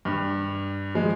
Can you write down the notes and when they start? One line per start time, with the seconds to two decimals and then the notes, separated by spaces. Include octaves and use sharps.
0.05 G2
0.95 F3 G#3